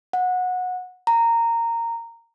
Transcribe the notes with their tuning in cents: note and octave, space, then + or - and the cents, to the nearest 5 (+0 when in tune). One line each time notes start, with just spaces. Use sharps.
F#5 -20
A#5 -15